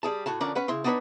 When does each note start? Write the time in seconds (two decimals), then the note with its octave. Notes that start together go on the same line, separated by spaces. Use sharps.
0.03 G3 G#4 A5
0.26 A2 F#4 A5
0.40 D3 F3 C#4 D4 A#4 D5
0.55 C#4 B4 F#5
0.68 C#3 E4 C6
0.84 B3 D4 D#4 A#4 B4 C#5